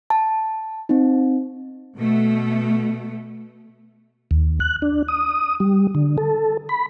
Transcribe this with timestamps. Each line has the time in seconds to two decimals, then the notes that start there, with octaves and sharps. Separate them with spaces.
0.10 A5
0.89 C4 D#4
1.97 B2 A3
4.31 D#2
4.60 F#6
4.82 D4
5.08 D#6
5.60 G3
5.95 D3
6.18 A4
6.69 B5